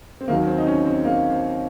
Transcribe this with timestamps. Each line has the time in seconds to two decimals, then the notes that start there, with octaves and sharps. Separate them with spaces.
0.21 C4
0.28 D#2 D#3 F#3 A#3
0.47 C4
0.58 D#4
0.67 C#4
0.85 C4
1.05 A#3
1.30 C4